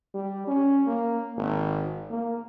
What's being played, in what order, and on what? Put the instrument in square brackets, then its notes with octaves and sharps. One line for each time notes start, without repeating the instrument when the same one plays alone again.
[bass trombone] G3
C#4
A#3
G#1
A#3